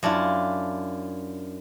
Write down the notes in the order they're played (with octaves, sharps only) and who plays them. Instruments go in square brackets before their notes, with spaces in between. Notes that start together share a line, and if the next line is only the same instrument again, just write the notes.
[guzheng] F#2 D4 E4 F4